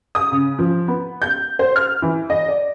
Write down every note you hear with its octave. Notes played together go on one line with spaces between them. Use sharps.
D#6
C#3
F3
B3
G6
C5
F6
E3
D#5
D5